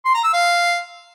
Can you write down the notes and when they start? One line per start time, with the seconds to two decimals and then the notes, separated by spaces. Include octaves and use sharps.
0.05 C6
0.14 A#5
0.24 E6
0.33 F5